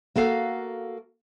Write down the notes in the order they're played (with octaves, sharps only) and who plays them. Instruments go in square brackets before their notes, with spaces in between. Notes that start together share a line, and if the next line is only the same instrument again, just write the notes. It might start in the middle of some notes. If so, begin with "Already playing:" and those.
[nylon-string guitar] A#3 F#4 A4 F5